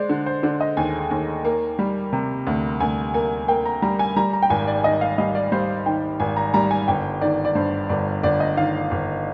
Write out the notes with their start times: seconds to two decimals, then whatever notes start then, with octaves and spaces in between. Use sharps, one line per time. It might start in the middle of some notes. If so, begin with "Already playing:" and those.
Already playing: G#3 C5 D5
0.09 D3
0.26 C5
0.43 D3 D5
0.61 D#5
0.77 D#2 G#5
1.11 D#2
1.45 A#3
1.79 G3
2.13 C3
2.47 D2
2.80 D2 G#5
3.14 A#3 G#5
3.48 A#3 G5
3.65 A#5
3.82 G3 A#5
3.99 G#5
4.16 G3 A#5
4.33 A#5
4.42 G5
4.50 G#1 G#5
4.67 D5
4.84 D#3 D#5
5.01 F5
5.18 G3 D#5
5.35 D5
5.52 G3 C5
5.86 D#3 G5
6.20 G#1 G#5
6.36 A#5
6.54 G3 A#5
6.71 G#5
6.88 G1 G5
7.21 D#3 D5
7.45 D5
7.55 G2 C5
7.89 G1 D5
8.23 G1 D5
8.40 D#5
8.57 D#3 F5
8.91 G1